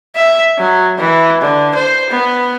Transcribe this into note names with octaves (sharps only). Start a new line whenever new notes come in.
E5
F#3
E3
D3
C5
B3